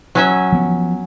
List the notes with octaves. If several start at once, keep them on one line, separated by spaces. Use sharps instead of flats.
F#3 C#4 E5
F3 B3